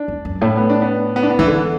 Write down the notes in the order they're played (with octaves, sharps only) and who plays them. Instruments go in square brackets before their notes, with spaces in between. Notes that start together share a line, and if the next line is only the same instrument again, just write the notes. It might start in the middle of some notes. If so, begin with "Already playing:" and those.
Already playing: [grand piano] D4
[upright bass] E2
F#2
A2
[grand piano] B3
D4
B3
B3
D4
B3
[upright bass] E2 [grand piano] E3
[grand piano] D3